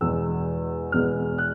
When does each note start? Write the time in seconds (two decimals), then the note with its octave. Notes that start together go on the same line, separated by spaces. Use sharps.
0.01 E2 B2 G#3 B3 E6
0.92 E2 B2 G#3 B3 F6
1.38 F#6